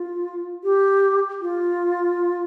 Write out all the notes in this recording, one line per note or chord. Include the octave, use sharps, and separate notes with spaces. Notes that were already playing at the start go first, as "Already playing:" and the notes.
Already playing: F4
G4
F4